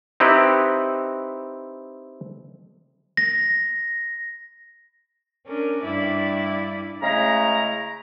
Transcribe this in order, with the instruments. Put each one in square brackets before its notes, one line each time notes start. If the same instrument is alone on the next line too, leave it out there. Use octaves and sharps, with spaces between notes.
[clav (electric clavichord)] C4 D#4 E4 G4 B4
[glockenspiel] A#6
[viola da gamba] C#4 D4 A#4
G2 E4 D5
[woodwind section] C#3 G#3 A3 E4 A#5